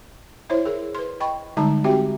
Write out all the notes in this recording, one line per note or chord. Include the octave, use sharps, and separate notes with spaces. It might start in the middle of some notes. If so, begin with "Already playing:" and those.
E4 C5 C#5 E5
G#4 A#4
B4 C6
D#5 G5 B5 C#6
D3 G3 G#3 D#4 A5 A#5
C4 F#4 G4 E5 G5